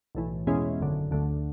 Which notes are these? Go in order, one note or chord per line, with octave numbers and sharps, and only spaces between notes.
B1 A2 E3
E2 B2 G#3 C#4 E4
G#1 F#2 D3
D2 D3 A3